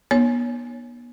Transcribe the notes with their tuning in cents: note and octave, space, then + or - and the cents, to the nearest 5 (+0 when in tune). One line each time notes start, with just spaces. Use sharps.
B3 -35 D#4 -40 C#5 +0